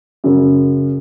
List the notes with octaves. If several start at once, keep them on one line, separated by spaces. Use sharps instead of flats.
F#2 C#3